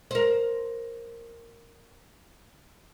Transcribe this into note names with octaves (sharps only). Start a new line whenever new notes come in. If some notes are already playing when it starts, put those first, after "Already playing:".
A#4 C5